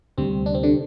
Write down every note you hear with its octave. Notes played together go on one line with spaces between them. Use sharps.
D2 C3 G3 C4
D4
C4
D3 D4